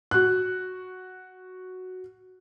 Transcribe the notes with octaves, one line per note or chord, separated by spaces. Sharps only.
F#4 F#6